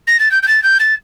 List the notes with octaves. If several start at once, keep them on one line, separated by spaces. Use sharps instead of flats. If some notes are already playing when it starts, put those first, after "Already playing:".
A#6
A6
G6
G6
A6
G6
A6